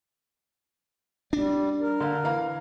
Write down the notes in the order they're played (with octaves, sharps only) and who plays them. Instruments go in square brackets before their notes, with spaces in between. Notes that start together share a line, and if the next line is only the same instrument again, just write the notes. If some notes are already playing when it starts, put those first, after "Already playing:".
[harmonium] G3 [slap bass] D4
[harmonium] A#4
[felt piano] D3 F5
E3 F5 A#5